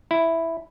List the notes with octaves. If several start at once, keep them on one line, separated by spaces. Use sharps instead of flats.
E4